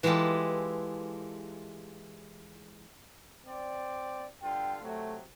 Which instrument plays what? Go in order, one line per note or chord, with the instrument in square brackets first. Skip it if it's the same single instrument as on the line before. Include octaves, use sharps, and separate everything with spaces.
[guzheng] E3 G#3 E4 F4 G4 A4
[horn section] C4 D5
[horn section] G2 D3 F4 [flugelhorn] G5
[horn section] C3 F#3 [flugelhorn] A3